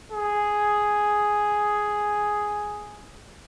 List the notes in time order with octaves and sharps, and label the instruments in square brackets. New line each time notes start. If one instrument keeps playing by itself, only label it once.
[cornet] G#4